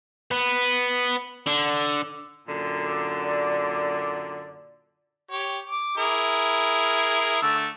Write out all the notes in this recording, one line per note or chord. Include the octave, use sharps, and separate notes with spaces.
B3
D3
F#2 A#2 D3
D5
G4 C#5
D6
E4 G#4 A#4
D3 A3 E6